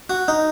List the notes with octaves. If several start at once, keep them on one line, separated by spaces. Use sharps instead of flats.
F#4
D#4